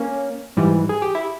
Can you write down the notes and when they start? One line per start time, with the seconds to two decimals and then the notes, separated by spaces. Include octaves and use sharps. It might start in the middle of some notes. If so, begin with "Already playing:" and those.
Already playing: A#3 C#4
0.57 G#2 E3 G3
0.89 G#4
1.02 G4
1.15 E4